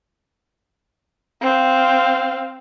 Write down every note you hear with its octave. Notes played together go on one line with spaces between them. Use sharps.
C4 F5